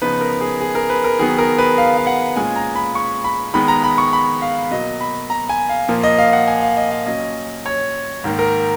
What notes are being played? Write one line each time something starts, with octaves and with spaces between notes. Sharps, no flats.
C#3 F3 B3 D#4 B4
A#4
G#4
G#4
A#4
B4
A#4
D#3 F#3 B3 G#4
A#4
B4
F5
F5
F#5
A#2 G#3 C#4 F4 G#5
A#5
B5
C#6
B5
D#3 G#3 B3 B5
A#5
B5
C#6
B5
F5
B2 F#3 A#3 D#5
B5
A#5
G#5
F5
A#2 F3 A#3
D#5
F5
F#5
G#5
F5
D#5
F5
A#2 F#3 C#4 D#5
C#5
G#2 D#3 A#3
A#4